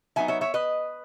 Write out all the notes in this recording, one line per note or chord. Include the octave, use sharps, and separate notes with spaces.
F#3 B3 D#4 E5 G#5
C#5 E5
C#5 E5
B4 D#5